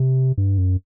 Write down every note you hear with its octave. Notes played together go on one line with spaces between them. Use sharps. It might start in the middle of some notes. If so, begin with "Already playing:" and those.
Already playing: C3
G2
F#2